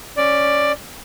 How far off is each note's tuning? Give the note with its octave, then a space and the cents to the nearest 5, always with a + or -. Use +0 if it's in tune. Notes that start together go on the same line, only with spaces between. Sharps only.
C#4 +0 D5 +5